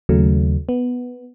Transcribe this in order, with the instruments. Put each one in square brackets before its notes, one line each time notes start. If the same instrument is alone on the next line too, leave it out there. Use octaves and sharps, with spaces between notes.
[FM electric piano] D#2 C#3 F#3 A3
B3